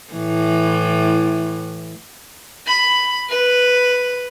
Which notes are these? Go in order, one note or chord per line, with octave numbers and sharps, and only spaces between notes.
A2 E3
B5
B4